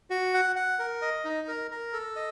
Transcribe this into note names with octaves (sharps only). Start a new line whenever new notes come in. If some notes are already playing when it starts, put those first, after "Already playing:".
F#4
F#5
F#5
A#4
D#5
D#4
A#4
A#4
A4
D#5